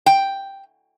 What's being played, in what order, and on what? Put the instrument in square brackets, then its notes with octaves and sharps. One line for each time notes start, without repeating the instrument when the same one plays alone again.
[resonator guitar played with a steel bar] G5